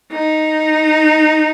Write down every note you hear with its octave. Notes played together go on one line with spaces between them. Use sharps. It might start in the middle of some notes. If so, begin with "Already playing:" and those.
D#4